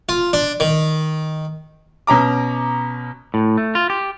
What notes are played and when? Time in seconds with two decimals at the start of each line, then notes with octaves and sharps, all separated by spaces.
0.09 F4
0.33 D4
0.60 D#3
2.07 B2 C#4 A#5 D6
3.34 A2
3.57 A3
3.75 F4
3.90 G4